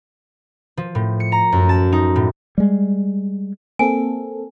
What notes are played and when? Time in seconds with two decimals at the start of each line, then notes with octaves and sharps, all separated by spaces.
0.77 F3
0.95 A2
1.20 C#7
1.32 A#5
1.52 F#2
1.69 A5
1.92 D#4
2.16 A2
2.58 G3 G#3
3.79 A#3 C4 A4 G#5